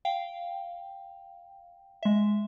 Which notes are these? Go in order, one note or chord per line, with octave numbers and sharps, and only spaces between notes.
F5 G5
G#3 E5